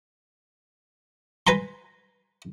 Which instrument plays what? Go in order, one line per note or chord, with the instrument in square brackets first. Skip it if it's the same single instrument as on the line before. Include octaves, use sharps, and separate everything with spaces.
[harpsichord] B4 G#5 A#5 C6